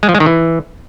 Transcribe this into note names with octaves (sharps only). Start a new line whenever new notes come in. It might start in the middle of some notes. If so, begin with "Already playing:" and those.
G#3
F3
G#3
D#3
E3